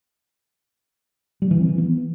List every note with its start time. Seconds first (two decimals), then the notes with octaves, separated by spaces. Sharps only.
1.42 G3
1.51 E3
1.60 C4
1.69 E3
1.78 B3